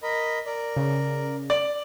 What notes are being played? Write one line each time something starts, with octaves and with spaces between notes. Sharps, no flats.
A#4 D#5 B5
A#4 D5
C#3
D5